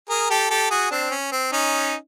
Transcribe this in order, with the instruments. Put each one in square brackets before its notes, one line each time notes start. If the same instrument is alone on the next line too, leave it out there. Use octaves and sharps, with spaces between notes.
[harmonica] G#4 A#4
G4 A4
G4 A4
F#4 G#4
C4 D4
C#4
C4
C#4 D#4